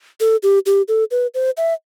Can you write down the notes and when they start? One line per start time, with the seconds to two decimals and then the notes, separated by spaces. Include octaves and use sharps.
0.20 A4
0.43 G4
0.66 G4
0.88 A4
1.11 B4
1.34 C5
1.57 E5